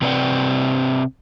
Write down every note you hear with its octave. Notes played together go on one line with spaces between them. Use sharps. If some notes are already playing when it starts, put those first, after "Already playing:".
C3 C4 B4 D5 F#5 G5